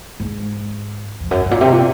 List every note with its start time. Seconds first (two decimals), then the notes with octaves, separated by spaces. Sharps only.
0.20 G#2
1.20 F2
1.31 F#2
1.41 G#2
1.51 A#2
1.61 C3
1.72 A#2